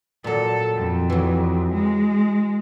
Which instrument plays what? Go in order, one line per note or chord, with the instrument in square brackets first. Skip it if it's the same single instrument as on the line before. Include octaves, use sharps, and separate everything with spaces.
[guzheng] A#2 F#3 [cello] A4
[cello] F2
[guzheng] E3 F#3
[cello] G#3